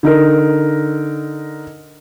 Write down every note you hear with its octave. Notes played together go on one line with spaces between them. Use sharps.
D3 D#4 A#4